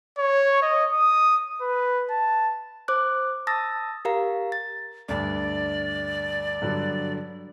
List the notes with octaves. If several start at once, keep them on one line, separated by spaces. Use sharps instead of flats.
C#5
D#5
D#6
B4
A5
C5 D6 F#6
A5 D#6 E6 A6 A#6
G4 A#4 F5 A#5
A6
D2 G2 D5
G2 D3 F#3